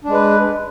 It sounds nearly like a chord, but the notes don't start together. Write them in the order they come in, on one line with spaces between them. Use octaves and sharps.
D4 G#3 B4